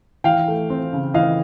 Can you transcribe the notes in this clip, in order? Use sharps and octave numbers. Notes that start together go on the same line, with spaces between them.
E3 F5 G5
A3
C4
C#3
E3 D#5 F5